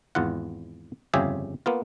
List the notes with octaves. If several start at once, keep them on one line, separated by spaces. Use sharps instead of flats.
G#1 E2 F4 F#5
G1 F2 C#3 G4 G#4 E5
A#3 B3 F4